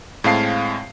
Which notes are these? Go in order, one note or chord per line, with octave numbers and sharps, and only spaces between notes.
A2 G#3 C4 F5 A5 C7